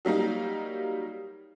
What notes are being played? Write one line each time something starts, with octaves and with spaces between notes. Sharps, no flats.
F#3 G3 A#3 D#4